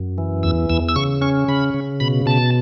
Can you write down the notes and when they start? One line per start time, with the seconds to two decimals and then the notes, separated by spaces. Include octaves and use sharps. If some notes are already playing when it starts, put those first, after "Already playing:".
Already playing: F#2
0.18 E3
0.43 E2 E6
0.69 E2 E6
0.89 E6
0.96 C#3 C#6
1.21 C#4 C#6
1.48 C#3 B5
1.74 C#3
2.00 B2 B5
2.26 B2 A5